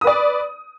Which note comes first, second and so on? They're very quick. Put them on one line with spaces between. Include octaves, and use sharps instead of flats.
D#6 B4 D5